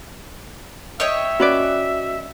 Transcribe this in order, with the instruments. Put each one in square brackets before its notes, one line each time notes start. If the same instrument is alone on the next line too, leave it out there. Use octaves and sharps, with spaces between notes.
[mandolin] C#5 D#5 G5 [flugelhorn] E5
[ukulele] C#4 B4 D5 [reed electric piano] F#4